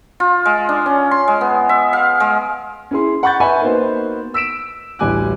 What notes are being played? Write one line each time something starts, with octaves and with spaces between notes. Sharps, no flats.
F4
G#3
D4
C#4
C6
G#3
B3
E5
F5
G#3
C#4 E4 G#4 C6
F#5 B5 C#6 G6 A6
B4 E5 F#5 G#5 B5 C#6
A#3 B3 D#4 F#4 B4 C5
E6 B6 D7 E7
A1 D2 G3 G#5 D6 F#6